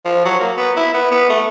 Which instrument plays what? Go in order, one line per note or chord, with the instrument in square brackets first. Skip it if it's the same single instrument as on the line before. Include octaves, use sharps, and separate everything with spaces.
[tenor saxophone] F3
F#3
A#3
B3
E4
B3
B3
A3